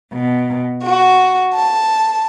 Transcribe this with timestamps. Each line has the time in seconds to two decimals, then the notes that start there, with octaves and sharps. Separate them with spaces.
0.14 B2
0.82 F#4
1.54 A5